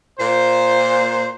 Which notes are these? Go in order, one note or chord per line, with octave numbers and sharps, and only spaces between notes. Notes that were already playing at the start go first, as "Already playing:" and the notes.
A#2 C5